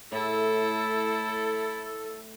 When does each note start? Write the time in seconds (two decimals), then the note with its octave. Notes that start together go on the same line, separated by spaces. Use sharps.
0.12 A2 E4 A4